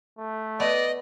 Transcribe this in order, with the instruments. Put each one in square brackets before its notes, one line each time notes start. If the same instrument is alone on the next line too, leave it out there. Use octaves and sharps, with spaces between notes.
[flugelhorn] A3
[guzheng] B3 [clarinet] D5 [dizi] D#5